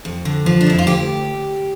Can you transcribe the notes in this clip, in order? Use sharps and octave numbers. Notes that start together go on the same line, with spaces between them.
F2
D3
F3
D4
F2 E4
F4
D2 G4